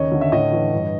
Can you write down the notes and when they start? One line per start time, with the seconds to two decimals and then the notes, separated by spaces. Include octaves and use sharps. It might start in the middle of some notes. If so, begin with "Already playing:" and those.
Already playing: D#2 C#3 C#5 D#5
0.12 D3
0.21 E5
0.32 A2 C#5 D#5
0.52 E3
0.73 G2